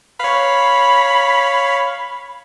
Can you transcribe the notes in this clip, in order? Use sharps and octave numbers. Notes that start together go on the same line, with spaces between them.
C#5 F5 B5